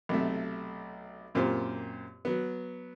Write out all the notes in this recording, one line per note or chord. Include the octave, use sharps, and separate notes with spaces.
B1 C3 A3
F#2 A#2 C4 F4 G4 C5
F#3 B3